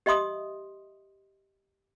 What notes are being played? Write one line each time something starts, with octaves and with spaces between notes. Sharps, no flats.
G4 D#5 E5 C6 D#6